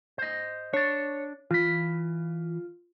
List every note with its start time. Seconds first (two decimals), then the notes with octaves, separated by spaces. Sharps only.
0.18 C5 D#5
0.73 D4 C#5 D5
1.51 E3 F4 B5